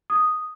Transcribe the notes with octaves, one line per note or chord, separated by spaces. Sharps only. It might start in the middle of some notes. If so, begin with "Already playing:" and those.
D#6